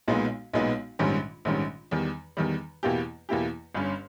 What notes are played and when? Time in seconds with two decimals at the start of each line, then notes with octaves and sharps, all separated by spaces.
0.08 B1 A#2 G#3 B3 D#4
0.53 B1 A#2 G#3 B3 D#4
0.99 A#1 G#2 D#3 G3 C#4
1.45 A#1 G#2 D#3 G3 C#4
1.91 E2 D#3 G3
2.37 E2 D#3 G3
2.83 E2 B2 A#3 E4 G4
3.29 E2 B2 A#3 E4 G4
3.75 G1 G2 G3 C#4